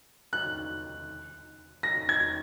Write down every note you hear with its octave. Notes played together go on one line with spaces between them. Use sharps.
F#6
A#6
G#6